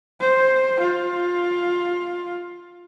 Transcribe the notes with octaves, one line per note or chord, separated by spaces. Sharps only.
C5
F4